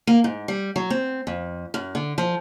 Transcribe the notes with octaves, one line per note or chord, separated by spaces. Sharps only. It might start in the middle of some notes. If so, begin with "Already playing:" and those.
A#3
G#2
G3
F#3
C4
F2
F#2
D3
F3